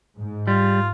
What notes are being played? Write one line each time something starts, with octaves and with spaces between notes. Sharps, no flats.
G#2
G3 F4